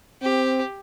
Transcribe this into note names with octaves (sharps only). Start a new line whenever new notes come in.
C4 G4